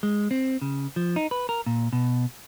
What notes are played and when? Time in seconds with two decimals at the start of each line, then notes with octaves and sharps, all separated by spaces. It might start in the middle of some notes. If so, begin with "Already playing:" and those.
0.03 G#3
0.31 C4
0.62 C#3
0.96 F3
1.16 D#4
1.31 B4
1.49 A#4
1.66 A#2
1.93 B2